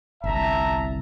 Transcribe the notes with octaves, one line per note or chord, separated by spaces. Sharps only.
G1 C2 E5 A5 A#5